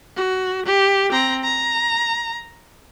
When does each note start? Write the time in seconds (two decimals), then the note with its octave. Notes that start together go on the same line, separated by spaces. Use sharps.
0.16 F#4
0.66 G4
1.12 C4 A#5
1.44 A#5